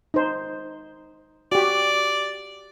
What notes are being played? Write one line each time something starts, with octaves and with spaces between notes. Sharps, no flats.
D#4 C5
F#4 G4 D5